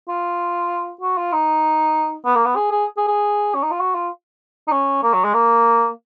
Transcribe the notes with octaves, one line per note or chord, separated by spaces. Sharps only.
F4
F#4
F4
D#4
B3
A#3
B3
G#4
G#4
G#4
G#4
C#4
D#4
F4
F#4
F4
D#4
C#4
A#3
F#3
G#3
A#3